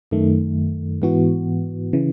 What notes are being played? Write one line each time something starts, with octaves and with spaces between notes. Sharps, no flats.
F#2 D#3 A3
G#2 E3 B3 F#4
C#3 E3